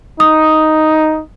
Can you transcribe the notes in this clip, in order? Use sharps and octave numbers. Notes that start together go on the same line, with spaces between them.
D#4 D#6